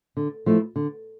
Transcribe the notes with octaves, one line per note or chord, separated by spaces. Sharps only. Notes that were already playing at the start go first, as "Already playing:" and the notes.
D3
F3 A3 E4
D3